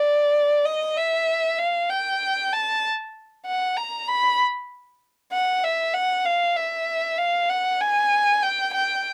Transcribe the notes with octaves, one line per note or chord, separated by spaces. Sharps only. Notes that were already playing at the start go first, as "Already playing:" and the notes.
Already playing: D5
D#5
E5
F5
G5
A5
F#5
A#5
B5
F#5
E5
F#5
F5
E5
F5
F#5
G#5
G5
G5